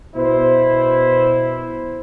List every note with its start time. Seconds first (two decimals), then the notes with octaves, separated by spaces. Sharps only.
0.15 B2 E4 C5